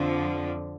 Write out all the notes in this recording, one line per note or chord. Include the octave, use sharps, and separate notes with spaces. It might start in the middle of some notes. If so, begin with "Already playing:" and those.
Already playing: F2 D3 F3